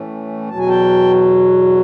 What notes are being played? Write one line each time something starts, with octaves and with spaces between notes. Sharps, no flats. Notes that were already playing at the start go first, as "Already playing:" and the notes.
Already playing: A2 E3 A3 C#4
E2 B2 F#3 A5
G#5
G5 A5